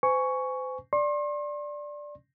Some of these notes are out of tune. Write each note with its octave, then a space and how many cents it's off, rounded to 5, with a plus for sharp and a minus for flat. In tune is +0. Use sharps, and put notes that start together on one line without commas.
C5 -40 G#5 +0 C#6 +10
D5 +0 C6 +40